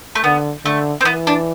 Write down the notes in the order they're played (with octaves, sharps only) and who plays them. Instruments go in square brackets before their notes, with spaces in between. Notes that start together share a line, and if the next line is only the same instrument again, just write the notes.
[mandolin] A3
[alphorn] D3 [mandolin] B3
[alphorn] D3 [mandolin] A3
[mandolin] C4
[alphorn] E3 [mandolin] B3
[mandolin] D4